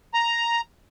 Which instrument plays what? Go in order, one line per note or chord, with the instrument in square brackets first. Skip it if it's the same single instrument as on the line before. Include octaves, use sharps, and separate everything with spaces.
[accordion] A#5